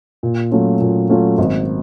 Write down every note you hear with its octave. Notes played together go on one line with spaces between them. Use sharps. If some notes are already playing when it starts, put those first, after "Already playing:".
A#2
F#3 A3 C#4 F4
A#2
F#3 A3 C#4 F4
G#1